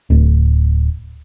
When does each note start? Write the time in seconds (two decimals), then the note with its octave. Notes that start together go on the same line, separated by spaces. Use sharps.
0.10 D1